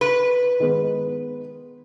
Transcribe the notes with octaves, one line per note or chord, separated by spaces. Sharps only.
B4
D#3 G#3 B3